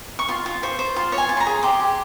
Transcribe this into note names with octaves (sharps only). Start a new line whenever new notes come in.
C#6
F4 C6
F4
C5 C#6
C5
F4 C6
C#5
G#5
F4
C6
A#5
G#4
G4 C6
G4